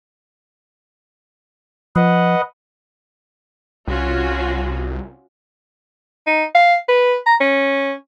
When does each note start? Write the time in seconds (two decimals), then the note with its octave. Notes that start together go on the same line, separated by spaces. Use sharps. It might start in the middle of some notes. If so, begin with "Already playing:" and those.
1.96 F3 B4 D#5 F#5
3.88 C2 C#4 F4 F#4
6.27 D#4
6.55 F5
6.89 B4
7.27 A#5
7.41 C#4